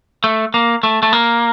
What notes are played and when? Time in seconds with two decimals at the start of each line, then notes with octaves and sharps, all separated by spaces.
0.24 A3
0.54 A#3
0.83 A3
1.03 A3
1.13 A#3